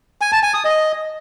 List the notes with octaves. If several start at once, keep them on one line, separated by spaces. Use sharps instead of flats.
G#5
A5
G#5
D#6
D#5